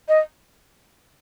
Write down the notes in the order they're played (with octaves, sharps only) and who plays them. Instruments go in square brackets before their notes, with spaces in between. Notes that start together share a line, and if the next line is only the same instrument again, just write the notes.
[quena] D#5